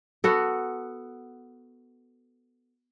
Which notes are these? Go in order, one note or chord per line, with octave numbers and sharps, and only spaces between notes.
B3 F#4 A4